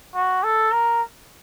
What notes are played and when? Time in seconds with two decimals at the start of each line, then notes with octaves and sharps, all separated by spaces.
0.15 F#4
0.44 A4
0.72 A#4